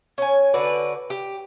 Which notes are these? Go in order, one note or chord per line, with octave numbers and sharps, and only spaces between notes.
C#4 G#5
D3 F#4 B4 D5
G4